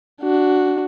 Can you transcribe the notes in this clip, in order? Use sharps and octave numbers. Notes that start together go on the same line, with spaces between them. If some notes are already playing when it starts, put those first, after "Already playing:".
D4 F#4